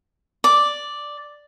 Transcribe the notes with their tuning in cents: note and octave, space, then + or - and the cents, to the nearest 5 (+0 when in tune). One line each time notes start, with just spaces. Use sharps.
D5 +0 D6 +0